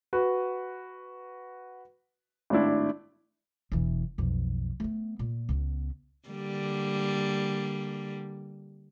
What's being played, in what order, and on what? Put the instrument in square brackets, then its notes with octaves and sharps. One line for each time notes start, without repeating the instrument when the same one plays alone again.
[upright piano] F#4 B4
G#1 A2 D4 E4
[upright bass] E1 E3
B1 F2
A3 B3
A#2
C#2 B3
[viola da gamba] D3 G3 A#3